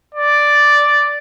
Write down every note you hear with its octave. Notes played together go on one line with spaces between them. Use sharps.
D5